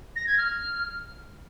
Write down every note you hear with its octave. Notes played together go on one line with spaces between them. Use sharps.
A#6
G#6
F6